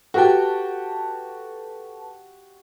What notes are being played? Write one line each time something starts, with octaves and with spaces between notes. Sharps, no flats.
F#4 G4 A4 B4 G5 A5